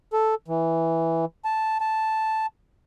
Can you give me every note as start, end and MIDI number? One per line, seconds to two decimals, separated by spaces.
0.13 0.35 69
0.48 1.25 52
1.45 1.78 81
1.81 2.46 81